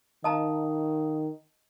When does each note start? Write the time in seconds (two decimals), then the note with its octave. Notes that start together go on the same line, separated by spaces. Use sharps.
0.24 D#3 D#5 F5 A5 A#5 D#6